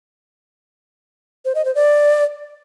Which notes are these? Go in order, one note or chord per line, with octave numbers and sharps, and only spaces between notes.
C5
D#5
C5
D5